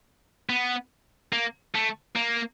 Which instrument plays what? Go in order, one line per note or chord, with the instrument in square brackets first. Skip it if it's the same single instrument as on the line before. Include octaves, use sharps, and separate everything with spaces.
[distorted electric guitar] B3
A#3
A3
A#3